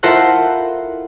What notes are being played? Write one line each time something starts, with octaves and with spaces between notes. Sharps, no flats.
E4 F4 A4 A#4 C5 F#5